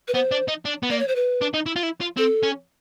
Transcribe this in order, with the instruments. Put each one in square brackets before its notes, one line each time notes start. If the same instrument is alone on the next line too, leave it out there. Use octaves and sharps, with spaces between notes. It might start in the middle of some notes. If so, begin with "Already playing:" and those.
[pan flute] B4
[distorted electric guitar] B3 [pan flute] C5
[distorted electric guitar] D4
D#4
D4
B3
[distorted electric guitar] A#3 [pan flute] D5
[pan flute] C#5
C5
B4
[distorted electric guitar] D4
D#4
E4
F4
E4
F4
[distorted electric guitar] C4 [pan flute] A4
[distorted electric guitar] C#4